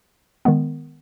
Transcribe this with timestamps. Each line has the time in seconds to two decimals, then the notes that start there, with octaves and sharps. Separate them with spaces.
0.45 D#3 G#3 B3